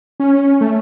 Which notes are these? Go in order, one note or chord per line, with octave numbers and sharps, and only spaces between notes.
C#4
A3